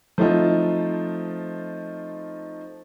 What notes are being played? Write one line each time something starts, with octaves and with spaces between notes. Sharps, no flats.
F3 A3 C4 D#4 F4